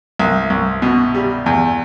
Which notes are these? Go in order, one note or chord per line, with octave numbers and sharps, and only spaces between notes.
C2
C2
B2
G3
E2